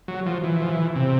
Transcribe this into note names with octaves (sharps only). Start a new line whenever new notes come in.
F#3
F3
E3
F3
E3
C3